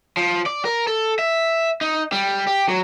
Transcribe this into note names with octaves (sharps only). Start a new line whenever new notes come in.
F3
D5
A#4
A4
E5
D#4
G3
G4
F#3